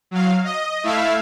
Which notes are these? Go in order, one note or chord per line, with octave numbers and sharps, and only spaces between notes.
F#3 F5
D#5
A3 E4 E5 F5